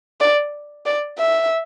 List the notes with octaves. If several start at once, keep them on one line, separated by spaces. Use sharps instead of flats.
D5
D5
E5